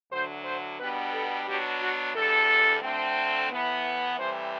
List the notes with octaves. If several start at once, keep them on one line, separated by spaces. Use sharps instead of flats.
D2 D3 F#3 C5
C5
B2 G3 B3 D4 B4
A4
B2 F#3 B3 D4 G4
F#4
E2 D3 G3 A4
D2 D3 A3 C4
A2 E3 B3
A2 E3 G3 C4 C5